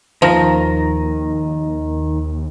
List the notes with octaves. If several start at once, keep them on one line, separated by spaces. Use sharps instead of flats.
D#2 D#3 F3 A#5